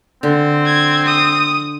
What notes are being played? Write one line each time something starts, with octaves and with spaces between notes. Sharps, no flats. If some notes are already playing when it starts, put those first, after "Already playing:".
D3 C4
G#6
D#6